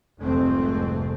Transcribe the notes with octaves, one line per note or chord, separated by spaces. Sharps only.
F1 C2 F2 G#2 A3 C4